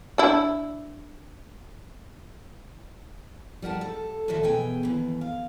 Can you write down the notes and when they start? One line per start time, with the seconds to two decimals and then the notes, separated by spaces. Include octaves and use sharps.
0.18 D4 E4
3.62 G3 A#4 F#5 A5
3.81 A4
4.28 D#2 A#2 F#4 A4 E5
4.43 B2 E3 G#4 G5 G#5
4.83 D#2 B2 E3
5.21 F5